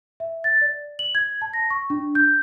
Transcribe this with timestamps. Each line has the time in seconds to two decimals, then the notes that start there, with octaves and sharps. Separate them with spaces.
0.20 E5
0.44 A6
0.61 D5
0.99 F#7
1.15 G#6
1.42 A5
1.53 A#6
1.70 C#6
1.90 D4
2.15 G6